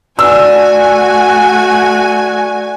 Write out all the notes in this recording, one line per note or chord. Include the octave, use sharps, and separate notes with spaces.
A3 D4 F#4 G#5 E6